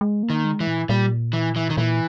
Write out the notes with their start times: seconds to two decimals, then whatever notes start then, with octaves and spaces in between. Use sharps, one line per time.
0.01 G#3
0.23 A#3
0.30 D#3
0.45 G#3
0.60 E3
0.67 A#2
0.89 A#2 G3
1.33 E3
1.56 E3
1.70 D#3
1.77 A#2 E3